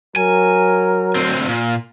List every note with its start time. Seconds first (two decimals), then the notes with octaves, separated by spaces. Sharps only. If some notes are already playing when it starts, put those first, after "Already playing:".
0.16 F#3 A#4 G#5
1.15 D2 C4
1.48 A#2